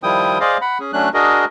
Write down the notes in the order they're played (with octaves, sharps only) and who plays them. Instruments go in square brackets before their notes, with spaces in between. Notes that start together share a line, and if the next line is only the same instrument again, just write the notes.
[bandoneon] D#3 F3 G3 E4 G5 D#6
G#4 C5 D5 D#5 F5
F#5 B5
C#4 G#4
F#3 A3 C#4 D4 F#6
D4 F#4 G#4 A#4 D#5